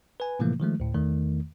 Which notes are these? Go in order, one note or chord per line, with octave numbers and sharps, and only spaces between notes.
B4 G#5
A2 C3 E3 F3 A3 A#3
D#3 F3 G#3 A3
D2 A2
E2 D#3 A3